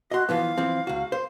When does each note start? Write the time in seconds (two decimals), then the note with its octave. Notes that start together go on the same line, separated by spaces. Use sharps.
0.12 F#4 D#5 C6
0.29 E3 F3 B3 F5
0.58 E3 F3 C4
0.87 C#2 F#4
1.12 C5